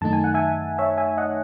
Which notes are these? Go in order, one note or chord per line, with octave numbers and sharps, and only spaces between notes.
F#2 D#3 A3 D#4 A5
G#5
F#5
E5 G#5
C#5 E5
E5 G#5
D#5 F#5